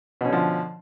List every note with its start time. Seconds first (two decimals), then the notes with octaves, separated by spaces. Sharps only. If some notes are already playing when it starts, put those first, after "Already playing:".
0.21 B2
0.25 C#4
0.29 D3
0.33 F3